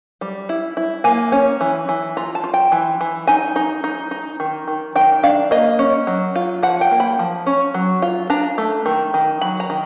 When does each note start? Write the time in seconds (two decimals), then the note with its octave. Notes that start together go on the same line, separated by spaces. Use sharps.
0.21 G3
0.49 E4
0.77 E4
1.04 A#3 G#5
1.32 C#4
1.61 E3
1.89 E3
2.17 F4 A#5
2.35 A5
2.44 F4
2.54 G5
2.72 E3
3.01 E3
3.27 D#4 G#5
3.56 D#4
3.84 D#4
4.11 D#4
4.40 D#3
4.68 D#3
4.96 D#3 G5
5.23 D4 F5
5.51 A#3 D#5
5.79 C#4
6.07 F#3
6.35 F4
6.63 F3 F#5
6.81 G5
6.91 A#3
7.00 B5
7.19 F3
7.46 C#4
7.74 F#3
8.02 F4
8.30 D4 A#5
8.58 A3
8.86 D#3
9.14 D#3
9.41 F#3 B5
9.60 A#5
9.70 D#3